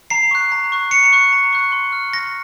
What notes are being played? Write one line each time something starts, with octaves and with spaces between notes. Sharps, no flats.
A#5 C7
C#6 F#6
A#5
C#6 F#6
A#5 C#7
C#6 F#6
A#5
C#6 F#6
C6
F6
C6 A#6